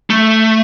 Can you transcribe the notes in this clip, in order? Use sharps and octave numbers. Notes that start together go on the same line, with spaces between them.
A3